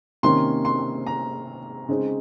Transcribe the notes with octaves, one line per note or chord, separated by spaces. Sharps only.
C3 D#3 A#3 C#4 C6
C6
A#5
C#3 G#3 C4 D#4